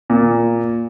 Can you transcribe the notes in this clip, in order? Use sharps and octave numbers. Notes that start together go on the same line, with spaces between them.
A#2